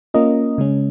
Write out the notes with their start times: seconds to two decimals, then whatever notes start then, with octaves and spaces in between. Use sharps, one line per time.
0.14 A#3 C#4 F4 A#4 D#5
0.58 C#3 G#3 C#4